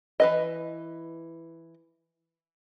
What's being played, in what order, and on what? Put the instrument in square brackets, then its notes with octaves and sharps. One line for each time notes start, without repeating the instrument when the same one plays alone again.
[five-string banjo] E3 B4 D#5